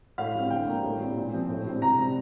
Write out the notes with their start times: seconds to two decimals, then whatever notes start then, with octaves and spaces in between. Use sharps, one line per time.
0.18 A2 F5
0.35 G3 C4
0.50 D3 G5
0.67 G3 A#3
0.84 A2
1.00 G3 C4
1.17 A#2
1.33 F3 C4
1.49 A2
1.66 G3 C4
1.82 C3 A#5
1.99 G3 C4